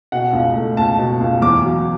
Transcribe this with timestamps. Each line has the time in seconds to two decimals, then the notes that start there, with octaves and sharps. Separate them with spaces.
0.12 B2 F#5
0.33 C#2
0.55 A3
0.77 C#2 A5
0.99 B2
1.21 C#2
1.42 E2 D6
1.64 F#3